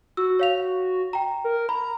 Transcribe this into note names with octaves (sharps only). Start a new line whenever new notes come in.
F#4 E6
C#5 F5 F7
G5 A#5
A#4
A#5 B5